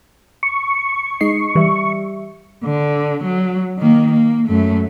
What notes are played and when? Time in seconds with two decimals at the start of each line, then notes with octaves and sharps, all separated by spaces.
0.43 C#6
1.21 G#3 D#4 D#5 C7
1.55 E3 G3 E5
2.64 D3
3.23 F#3
3.78 D#3 A#3
4.12 A#3
4.48 F#2 A3